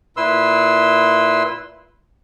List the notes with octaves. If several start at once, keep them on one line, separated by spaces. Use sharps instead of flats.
A#2 E4 B4 C6 E6